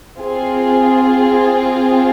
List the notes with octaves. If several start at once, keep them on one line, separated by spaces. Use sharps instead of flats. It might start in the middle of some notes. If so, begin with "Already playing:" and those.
C4 F4 G#4